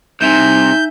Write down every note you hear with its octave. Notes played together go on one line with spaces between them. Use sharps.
C2 C3 D#4 E5 G#5 G6